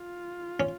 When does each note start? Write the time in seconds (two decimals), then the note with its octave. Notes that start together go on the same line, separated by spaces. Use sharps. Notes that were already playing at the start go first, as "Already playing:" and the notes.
Already playing: F4
0.60 C#4